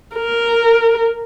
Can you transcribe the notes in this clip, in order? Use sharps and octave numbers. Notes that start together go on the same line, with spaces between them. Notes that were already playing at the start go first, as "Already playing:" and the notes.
A#4